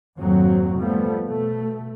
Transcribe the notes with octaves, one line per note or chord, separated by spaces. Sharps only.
G#1 F2 A#2 F#3 C4
F3 G3 A3 B3
B2 A3